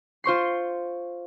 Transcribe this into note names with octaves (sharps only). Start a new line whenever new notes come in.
F4 C5 C#6 C7